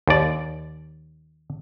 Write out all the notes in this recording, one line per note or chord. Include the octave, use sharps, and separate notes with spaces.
D#2 D5